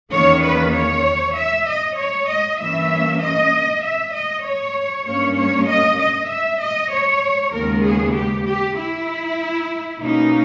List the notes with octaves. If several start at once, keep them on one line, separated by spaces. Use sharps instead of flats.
E2 D#3 A#3 C#4 C#5
B4
C#5
E5
D#5
C#5
D#5
G2 E3 A#3 C#4 E5
D#5
E5
D#5
C#5
G2 G3 A#3 C#4 C#5
C#5
D#5
D#5
E5
D#5
C#5
D#2 C#3 G#3 B3 A#4
G#4
G4
G4
E4
B2 A#3 C#4 D#4